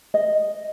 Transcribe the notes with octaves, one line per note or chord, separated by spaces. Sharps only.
D#5